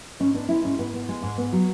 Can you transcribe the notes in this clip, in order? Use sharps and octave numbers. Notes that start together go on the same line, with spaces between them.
G#2 C#4
B3 D4
G#3 E4
G#2 C#4
G#2 B3
B3
G#3
G#2
B3
F#3